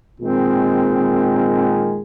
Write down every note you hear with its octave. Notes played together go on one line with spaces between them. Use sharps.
A#2 D#3 G#3 C4